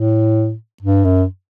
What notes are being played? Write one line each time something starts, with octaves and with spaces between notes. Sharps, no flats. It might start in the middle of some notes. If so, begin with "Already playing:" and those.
Already playing: A2
G2
F#2